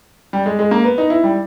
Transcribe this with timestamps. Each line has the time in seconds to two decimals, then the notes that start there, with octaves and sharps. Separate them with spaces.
0.33 G3
0.46 G#3
0.59 G#3
0.71 A#3
0.84 B3
0.98 D#4
1.10 E4
1.24 G3